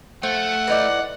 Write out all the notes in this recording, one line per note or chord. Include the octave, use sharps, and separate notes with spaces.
F3 A3 F#5
E3 D#4 D5